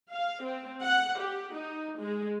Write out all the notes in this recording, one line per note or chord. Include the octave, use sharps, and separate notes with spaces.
F5
C4
F#5
G4
D#4
G#3